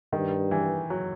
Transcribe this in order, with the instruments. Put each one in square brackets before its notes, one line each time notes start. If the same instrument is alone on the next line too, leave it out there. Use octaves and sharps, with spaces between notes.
[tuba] G2 [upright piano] D#3
[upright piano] E3
F#3